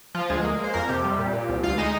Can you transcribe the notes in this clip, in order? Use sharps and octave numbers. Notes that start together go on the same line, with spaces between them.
F3 F4
D2 G#3 G#4
A#3
A#3
C5
F2 A#3 A#4
C3 G4
G3
A#2
A#2
C2
D2 F4 F5
G#3 D#4 D#5